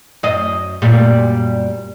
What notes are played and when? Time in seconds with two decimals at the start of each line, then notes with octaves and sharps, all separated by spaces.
0.23 F#2 D#5
0.82 F#2 A#2 G3